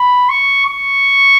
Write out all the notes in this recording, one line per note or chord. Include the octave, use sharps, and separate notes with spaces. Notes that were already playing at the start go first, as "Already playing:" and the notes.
Already playing: B5
C#6
C#6